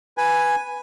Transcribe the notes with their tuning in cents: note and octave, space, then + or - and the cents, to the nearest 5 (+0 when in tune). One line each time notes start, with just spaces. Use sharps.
B4 +0 G#5 +0